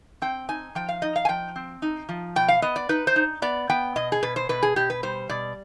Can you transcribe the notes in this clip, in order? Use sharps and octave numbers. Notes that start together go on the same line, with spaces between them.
C4 G5
D#4 G#5
F3 G5
F5
D#4 D#5
F5
G#5
F3 G5
C4
D#4
F3
B2 G5
F5
B3 D#5
D5
D#4 B4
C5
D#4
B3 D5
B3 G5
B2 D#5
G#4
B2 B4
C5
B2 B4
G#4
B2 G4
B4
G3 C5
B2 D5